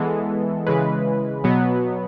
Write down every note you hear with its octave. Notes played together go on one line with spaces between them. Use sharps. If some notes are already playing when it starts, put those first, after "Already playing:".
Already playing: E3 G#3 B3 A4
C#3 E3 G#3 B4
B2 F#3 B3